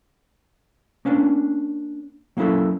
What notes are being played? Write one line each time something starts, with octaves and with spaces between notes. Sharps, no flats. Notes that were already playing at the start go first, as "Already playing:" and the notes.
A#3 C#4 D4
F#3 A#3 C#4 E4 A4